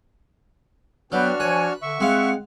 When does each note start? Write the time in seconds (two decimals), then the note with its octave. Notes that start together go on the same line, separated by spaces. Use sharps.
1.12 F#3 B3 D4 F#4 B4 G5 F6
1.40 F3 B4 C#5 G#5
1.82 D3 E5 C#6
2.00 G#3 C4 F5 F#5